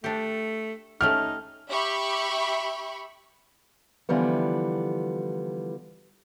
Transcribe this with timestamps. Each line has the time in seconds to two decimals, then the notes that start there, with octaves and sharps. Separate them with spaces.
0.04 A3 D4 G4
1.01 A3 C#4 D#4 G4 F6
1.70 G4 E5 B5 C#6
4.09 D3 E3 F3 G3 B3